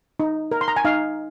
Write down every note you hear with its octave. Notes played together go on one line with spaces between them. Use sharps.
D#4
A#4
C6
A#5
G#5
D#4 F5